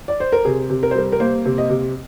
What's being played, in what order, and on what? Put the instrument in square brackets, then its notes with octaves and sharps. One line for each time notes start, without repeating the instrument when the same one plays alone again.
[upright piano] D5
C5
A#4
C3 G#4
C3
A#4
C5
G3 A#4
A#4
A#3 C5
C3
D#5
C3